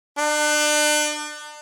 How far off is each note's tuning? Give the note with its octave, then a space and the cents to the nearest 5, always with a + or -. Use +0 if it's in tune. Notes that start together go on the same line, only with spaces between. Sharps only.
D4 +35